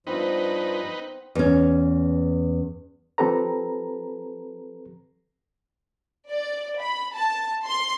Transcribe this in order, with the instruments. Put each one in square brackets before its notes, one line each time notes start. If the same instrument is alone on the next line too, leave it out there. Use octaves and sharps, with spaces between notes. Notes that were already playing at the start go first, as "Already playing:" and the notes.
[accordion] G2 F3 [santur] B3 C4 [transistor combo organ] D#4 B4
[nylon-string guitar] E2 C#4
[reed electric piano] F3 C4 G4 A4 B4 A#5
[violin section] D5
B5
A5
C6